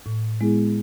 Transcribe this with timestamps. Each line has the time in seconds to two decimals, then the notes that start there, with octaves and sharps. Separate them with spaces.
0.06 A2
0.41 G#3 B3 E4 G#4